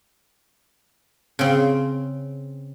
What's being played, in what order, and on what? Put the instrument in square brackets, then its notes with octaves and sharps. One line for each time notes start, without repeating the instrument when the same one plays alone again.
[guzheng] C#3 C4